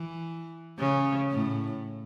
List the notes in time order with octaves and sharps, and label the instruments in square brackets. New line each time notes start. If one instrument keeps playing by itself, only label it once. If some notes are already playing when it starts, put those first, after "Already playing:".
Already playing: [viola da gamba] E3
C#3
A2